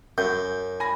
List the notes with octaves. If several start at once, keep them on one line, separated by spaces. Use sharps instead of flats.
F#2 G6
G#5 B5 A#6